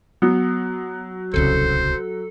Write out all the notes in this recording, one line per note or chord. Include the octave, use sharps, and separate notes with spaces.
F#3 B3
D1 C2 C#3 A4 C5